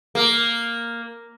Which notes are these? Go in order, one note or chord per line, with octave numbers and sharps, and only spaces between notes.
A#3